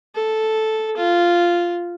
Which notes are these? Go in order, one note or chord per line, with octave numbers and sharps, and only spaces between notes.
A4
F4